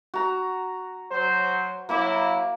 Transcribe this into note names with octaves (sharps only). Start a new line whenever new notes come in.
F#4 A#5
F#3 C5
F#3 A#3 E4 B5 D6